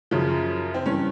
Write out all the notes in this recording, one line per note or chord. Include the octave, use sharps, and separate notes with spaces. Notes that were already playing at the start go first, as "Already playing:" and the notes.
F#2 C#3 F3
C4
G2 E3 C#4